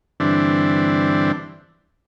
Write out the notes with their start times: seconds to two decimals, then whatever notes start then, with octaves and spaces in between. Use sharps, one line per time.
0.20 G2 D3 E3 C4 D4